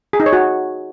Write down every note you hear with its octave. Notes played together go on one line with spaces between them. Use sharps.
G#4
D#4
C#5
F#4